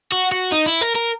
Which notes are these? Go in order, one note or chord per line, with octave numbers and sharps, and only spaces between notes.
F#4
F#4
D#4
E4
A#4
A#4